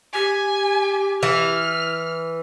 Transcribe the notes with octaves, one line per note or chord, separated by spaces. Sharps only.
G4 G#5
E3 F6